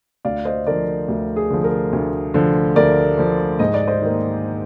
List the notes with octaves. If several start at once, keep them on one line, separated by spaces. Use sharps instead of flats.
D2 D5 F5
C5 D#5
D3 F3 A#4 D5
D2
G#4
D3 F3
A#4
D2
D3 F3
D2 A#4 D5
D3 F3
G#2 D#5
D5
C5 D#5
D#3 A#3